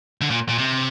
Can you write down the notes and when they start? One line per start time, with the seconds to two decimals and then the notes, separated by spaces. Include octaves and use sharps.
0.21 D3
0.30 A#2
0.49 A#2
0.58 C3